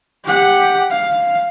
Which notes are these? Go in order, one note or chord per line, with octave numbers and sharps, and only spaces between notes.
G4 F#5
F5